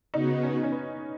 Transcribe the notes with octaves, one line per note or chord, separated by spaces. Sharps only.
C#3 B3 D#4 F#4
C#4
C#4
B3